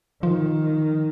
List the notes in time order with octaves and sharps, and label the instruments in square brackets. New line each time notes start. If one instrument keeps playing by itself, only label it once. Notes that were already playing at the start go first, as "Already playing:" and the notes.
[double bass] D#3 [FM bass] F3